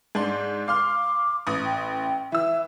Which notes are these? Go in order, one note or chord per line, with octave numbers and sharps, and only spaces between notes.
G#2 D4 C6
F5 C6 D6 F6
A1 D#6
G5
E3 E5 E6